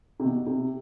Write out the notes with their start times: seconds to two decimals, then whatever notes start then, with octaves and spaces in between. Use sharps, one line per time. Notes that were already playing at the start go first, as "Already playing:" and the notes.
0.20 C3
0.25 B2
0.47 C3